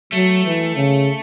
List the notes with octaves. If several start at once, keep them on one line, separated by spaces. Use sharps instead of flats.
F#3 A3
E3
C#3